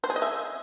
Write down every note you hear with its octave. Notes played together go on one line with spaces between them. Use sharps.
C5
G#4
D#5
E5